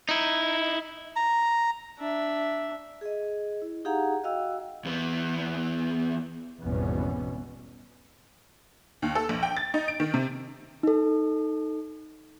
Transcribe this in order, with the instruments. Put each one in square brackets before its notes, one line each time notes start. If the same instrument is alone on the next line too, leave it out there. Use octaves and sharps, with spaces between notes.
[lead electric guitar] D#4 E4
[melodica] A#5
[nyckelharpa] D4 E5
[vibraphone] G#4 D#5
E4
D#4 G4 G#4 F5 F#5 A#5
F#4 D#5 F5 G5 E6
[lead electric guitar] E2 B3
[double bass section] G#1 E2 B2 G3 B3 C#4
[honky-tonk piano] D#2
A4
A#1
G5
A6
D#4
D7
D#3
C3
[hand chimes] D#4 A4